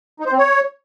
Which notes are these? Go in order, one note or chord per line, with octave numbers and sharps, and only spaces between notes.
D#4
C5
C4
C#5